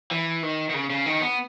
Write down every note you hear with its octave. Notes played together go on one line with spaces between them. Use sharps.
E3
D#3
D#3
C#3
C#3
D#3
B3